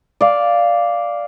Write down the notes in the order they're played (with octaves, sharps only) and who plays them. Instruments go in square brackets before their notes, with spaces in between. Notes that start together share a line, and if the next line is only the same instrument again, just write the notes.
[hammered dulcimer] D5 F5